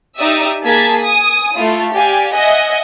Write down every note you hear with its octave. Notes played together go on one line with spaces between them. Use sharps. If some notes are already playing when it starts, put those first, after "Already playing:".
D#4 G4 D5 E5 D#6 E6
A#3 G#4 A5 G#6 B6
G#5 D#6
A3 E4 F4
G4 D5 F5 G#5
D#5 E5 F#5 G#5